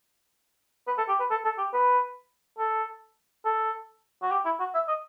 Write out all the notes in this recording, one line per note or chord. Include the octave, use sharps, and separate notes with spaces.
B4
A4
G4
B4
A4
A4
G4
B4
A4
A4
F#4
G4
E4
F#4
E5
D#5